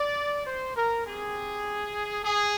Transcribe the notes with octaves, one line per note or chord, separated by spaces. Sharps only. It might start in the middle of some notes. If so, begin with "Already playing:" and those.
Already playing: D5
C5
A#4
C4 G4 G#4
G#4